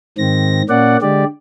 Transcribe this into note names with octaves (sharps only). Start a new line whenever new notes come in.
G#2 D#3 C4 A#6
A#2 A#3 C#4 D5 F#5
D3 G#3 G4 D5